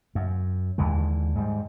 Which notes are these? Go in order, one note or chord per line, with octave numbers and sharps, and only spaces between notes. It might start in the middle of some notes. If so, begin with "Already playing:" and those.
F#2
D#2 D3 E3 G#3
G#2 G3